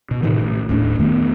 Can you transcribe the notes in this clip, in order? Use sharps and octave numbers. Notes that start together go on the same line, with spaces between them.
B2
A2 C3 D#3 E3
A1
D#1 A2 C#4 D4
E2 D#3 A3 B3